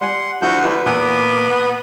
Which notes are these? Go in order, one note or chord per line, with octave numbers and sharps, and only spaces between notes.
G3 F#5 G#5 C6
D2 F3 E4 F#4 F#5 G6
D4 E4 G4 B4
E2 A#2 A#3 B3 G#5 D6 E6